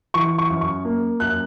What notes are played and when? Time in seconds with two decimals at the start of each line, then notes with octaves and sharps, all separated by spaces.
0.14 E3 C#6
0.38 C#6
0.50 F#2
0.61 C#6
0.85 A#3
1.20 F#2 F#6